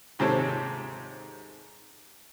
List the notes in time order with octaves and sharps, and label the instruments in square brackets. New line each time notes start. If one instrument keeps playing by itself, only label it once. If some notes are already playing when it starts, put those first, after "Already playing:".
[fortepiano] D#2 G#2 C3 C4 A4 C#5